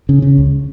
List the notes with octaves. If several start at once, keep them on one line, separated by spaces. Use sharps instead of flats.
C#3
C#3
C#2